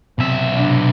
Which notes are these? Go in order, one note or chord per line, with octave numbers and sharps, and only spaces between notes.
B1 C3 C4 E5
C3 D4